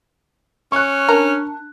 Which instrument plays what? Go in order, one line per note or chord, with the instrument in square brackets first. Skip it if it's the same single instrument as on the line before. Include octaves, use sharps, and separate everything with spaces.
[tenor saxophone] C#4 [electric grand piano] C#6 F#6
[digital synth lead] D4 [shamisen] A#4